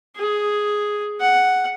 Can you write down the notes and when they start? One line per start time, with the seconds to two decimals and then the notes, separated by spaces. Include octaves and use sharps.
0.16 G#4
1.20 F#5